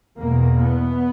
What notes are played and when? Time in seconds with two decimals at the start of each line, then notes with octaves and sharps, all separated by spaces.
0.17 E2 B2 A#3
0.63 B3